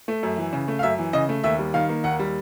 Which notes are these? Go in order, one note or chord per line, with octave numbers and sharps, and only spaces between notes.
A3
F#2
E3
C#3
A3
F5
F#2 E5
E3
C#3 D#5
A3
D#2 E5
G3
D#3 F5
A#3
D#2 F#5
G3